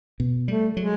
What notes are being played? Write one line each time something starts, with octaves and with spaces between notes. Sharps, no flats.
B2
G3 A3
F#3 G#3